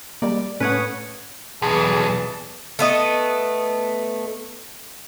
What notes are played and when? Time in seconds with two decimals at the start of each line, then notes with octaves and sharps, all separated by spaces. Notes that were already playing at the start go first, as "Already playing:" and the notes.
0.22 G3 G#3 A#3 D5
0.60 A2 C#4 A4 B4 C#5 F#5 D#6
1.62 B1 E2 E3 G#4 A5
2.79 A3 B3 D#5